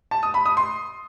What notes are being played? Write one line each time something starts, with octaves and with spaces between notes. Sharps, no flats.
A5
D#6
B5
D#6
C6